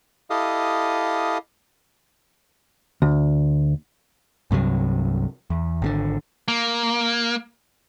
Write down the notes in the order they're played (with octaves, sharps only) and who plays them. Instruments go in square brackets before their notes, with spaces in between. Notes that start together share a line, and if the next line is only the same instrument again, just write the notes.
[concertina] E4 G4 A4 D#5 F5 D#6
[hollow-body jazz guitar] D2
[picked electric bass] C2 G2 C3 F#3
E2
G#1 B2 D3
[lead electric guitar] A#3